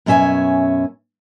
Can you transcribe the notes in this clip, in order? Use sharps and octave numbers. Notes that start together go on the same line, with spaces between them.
F#2 B2 C#4 E5 G#5